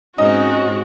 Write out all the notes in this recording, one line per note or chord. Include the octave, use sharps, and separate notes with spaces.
G#2 C4 C#4 D#4 F#4 D#5